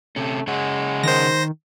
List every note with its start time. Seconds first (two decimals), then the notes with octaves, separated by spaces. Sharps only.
0.16 C3 A3 C#4
0.47 C#3 G#3 C#5 F#5
1.04 D#3 C5 A#6